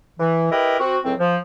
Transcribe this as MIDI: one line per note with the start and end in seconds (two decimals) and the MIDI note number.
0.19 0.51 52
0.51 0.75 64
0.51 0.75 67
0.51 0.75 70
0.51 0.75 71
0.51 0.75 75
0.79 0.98 60
0.79 0.98 66
1.04 1.14 37
1.04 1.14 45
1.04 1.14 54
1.04 1.14 60
1.19 1.37 53